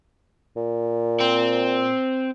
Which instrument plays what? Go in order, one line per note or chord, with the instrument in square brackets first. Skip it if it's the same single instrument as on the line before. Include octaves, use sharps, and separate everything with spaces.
[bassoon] A#2
[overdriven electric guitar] C4